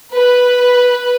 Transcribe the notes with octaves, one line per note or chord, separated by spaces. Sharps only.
B4